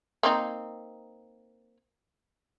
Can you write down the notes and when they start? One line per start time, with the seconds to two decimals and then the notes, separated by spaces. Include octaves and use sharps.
0.23 A#3 C4 D#4